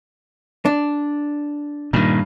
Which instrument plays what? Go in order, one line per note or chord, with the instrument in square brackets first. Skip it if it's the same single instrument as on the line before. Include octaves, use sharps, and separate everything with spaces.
[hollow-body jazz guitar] D4
[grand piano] G2 [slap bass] A#2 D#3